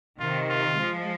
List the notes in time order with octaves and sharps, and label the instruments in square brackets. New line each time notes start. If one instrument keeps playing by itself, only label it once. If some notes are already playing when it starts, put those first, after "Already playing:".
[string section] C3 D#3 [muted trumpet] F4
[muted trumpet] F4
[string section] F3 G#3